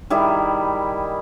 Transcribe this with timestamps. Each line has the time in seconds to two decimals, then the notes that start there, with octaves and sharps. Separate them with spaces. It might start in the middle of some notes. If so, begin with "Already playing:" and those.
0.10 D#3 G3 E4 G#4